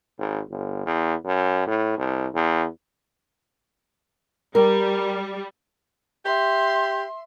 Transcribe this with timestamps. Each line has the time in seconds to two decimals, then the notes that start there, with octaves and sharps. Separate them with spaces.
0.19 G#1
0.50 G1
0.86 E2
1.25 F#2
1.67 A2
1.98 C2
2.34 E2
4.55 G3 A#4
6.25 G4 E5 C6